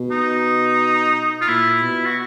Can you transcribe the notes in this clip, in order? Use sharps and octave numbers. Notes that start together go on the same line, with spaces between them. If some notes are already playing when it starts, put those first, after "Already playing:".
Already playing: B2
D#4
F4
A#2 E4
B2
F#4